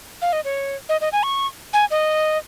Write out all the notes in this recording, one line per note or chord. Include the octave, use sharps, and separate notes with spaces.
F5
D#5
C#5
D#5
D#5
G#5
C#6
G#5
D#5